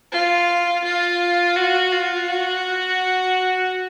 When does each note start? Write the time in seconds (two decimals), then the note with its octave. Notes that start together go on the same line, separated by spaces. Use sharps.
0.12 F4
0.84 F4
1.56 F#4
1.92 F4
2.28 F#4